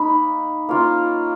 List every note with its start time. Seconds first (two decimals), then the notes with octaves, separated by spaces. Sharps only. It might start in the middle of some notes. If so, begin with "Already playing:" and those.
Already playing: A#3 D#4 B5
0.69 A#3 C#4 F4